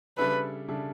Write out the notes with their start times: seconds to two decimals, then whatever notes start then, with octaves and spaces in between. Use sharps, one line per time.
0.17 C#3 G3 D4 A4 B4 E5
0.68 C#3 G3 D4 A4 E5